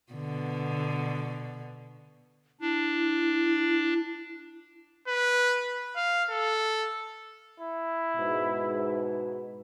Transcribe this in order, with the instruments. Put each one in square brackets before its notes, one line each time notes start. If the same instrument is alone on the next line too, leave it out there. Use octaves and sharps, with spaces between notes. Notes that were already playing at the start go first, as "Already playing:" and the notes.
[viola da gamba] B2 D3
[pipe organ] D4 [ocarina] E4
[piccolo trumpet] B4
F5
A4
[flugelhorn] E4
[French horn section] G#2 B2